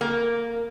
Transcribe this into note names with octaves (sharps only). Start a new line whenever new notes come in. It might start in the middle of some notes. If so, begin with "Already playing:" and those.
A#3